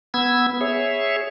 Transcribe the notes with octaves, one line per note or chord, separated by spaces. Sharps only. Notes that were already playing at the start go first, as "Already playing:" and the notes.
B3 E6 G#6
G#4 C#5 E5